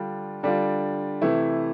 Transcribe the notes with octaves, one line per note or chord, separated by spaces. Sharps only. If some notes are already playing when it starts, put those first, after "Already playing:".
Already playing: D3 G3 D4 F4
D3 G3 D4 F4
C3 E3 A3 E4